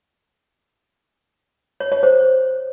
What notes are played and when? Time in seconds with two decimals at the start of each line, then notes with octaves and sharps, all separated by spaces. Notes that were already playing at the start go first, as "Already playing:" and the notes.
1.80 C#5
1.92 C#5
2.03 C5